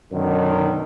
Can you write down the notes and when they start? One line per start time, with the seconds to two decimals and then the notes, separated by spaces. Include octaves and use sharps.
0.12 F#2 B2 D3 D#3